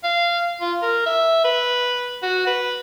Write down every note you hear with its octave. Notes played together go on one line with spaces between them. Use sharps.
F5
F4
A#4
E5
B4
F#4
B4